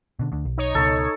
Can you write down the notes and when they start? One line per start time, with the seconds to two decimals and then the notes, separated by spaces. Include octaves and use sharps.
0.19 B2 D3
0.32 D2 D3
0.45 B1
0.58 D#4 C#5
0.75 C#2 B2 A4